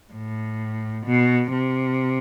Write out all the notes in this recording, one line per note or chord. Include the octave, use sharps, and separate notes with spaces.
A2
B2
C3